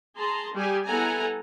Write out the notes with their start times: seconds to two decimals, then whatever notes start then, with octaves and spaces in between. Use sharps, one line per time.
0.16 G#4 A5 A#5 C6
0.54 G3 G4 G#4 G#5
0.87 B3 E4 A4 F#5 G#5 A#5